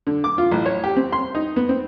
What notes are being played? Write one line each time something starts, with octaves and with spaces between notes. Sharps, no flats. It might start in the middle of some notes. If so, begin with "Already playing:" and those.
D3
D6
F4
A1
C#5
G4
C4
C6
D#4
B3
C4